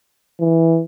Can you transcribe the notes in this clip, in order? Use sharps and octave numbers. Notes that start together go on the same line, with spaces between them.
E3